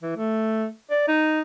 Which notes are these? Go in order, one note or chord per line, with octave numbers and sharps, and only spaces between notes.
E3
A3
D5
D#4